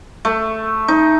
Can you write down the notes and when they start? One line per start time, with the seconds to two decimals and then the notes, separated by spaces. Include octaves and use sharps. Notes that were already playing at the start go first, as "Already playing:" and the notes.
0.25 A3
0.88 D#4